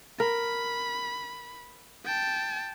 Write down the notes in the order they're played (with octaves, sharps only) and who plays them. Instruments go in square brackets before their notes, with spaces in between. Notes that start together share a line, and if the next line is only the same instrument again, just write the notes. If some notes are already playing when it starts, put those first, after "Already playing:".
[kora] A#4 [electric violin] B5
[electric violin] G5 A5